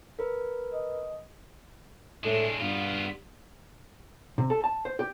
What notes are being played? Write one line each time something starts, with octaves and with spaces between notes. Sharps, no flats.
A#4 B4
D#5
A2 G#3 D4 E5
G2 B3 F4 F5
C3
A4
A5
C5
G4